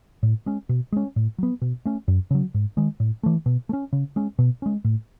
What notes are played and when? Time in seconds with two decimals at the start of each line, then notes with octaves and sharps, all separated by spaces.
0.23 A2
0.46 G#3 C#4
0.69 B2
0.92 G#3 C#4
1.16 A2
1.38 F#3 B3
1.62 B2
1.85 A3 C#4
2.08 F#2
2.31 C#3 F#3
2.54 G#2
2.77 D#3 G#3
3.00 A2
3.23 E3 A3
3.46 B2
3.69 A3
3.73 C#4
3.93 C#3
4.16 G#3 C#4
4.39 B2
4.62 G#3 C#4
4.84 A2